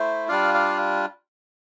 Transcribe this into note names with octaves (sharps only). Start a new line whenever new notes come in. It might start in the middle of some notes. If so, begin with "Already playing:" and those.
Already playing: A3 E4 C5
G3 D4 F4 D5 F5
D5 F5